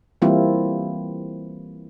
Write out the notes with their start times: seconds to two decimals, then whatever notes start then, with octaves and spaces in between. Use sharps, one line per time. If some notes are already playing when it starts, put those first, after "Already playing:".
0.22 E3 G3 A#3 C4 E4 F4